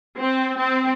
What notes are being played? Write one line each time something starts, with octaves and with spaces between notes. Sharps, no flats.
C4
C4